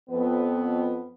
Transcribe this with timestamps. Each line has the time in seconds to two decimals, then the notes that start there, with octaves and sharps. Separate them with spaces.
0.10 F2 B3